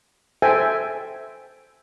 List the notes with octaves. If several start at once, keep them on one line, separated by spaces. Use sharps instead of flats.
A4 C5 E5 G5 G#5